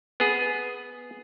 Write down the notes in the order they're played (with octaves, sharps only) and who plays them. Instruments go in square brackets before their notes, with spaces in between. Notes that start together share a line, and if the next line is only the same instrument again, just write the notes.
[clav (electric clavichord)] B3 G#4